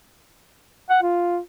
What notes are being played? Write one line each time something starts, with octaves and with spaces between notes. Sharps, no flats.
F#5
F4